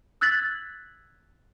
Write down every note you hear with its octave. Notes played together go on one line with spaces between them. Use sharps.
E6 F#6 G#6 A6 B6 F#7